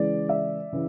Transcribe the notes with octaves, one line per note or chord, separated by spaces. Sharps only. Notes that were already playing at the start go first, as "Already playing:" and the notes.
Already playing: C#3 E3 G#3 D5
D5 E5
C#3 E3